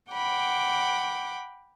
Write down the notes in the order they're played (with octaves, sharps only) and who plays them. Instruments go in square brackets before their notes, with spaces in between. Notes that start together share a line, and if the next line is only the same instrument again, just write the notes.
[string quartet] F#5 G5 B5 D6